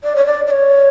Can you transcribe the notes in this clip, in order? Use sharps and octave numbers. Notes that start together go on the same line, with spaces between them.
D5
C#5
D5
D5
C#5